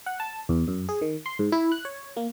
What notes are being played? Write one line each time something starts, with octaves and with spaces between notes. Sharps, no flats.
F#5
A5
E2
F#2
G#4
D#3
C6
G#2
E4
F#6
C#5
A#3